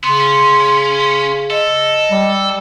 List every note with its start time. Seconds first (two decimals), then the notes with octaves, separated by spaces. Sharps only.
0.04 C#3 B3 C6
0.20 C#4
1.50 A4 D#5
2.11 G3